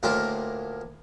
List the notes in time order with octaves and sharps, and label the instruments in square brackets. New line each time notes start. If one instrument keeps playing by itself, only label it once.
[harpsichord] D2 A2 A#3 F4 A#4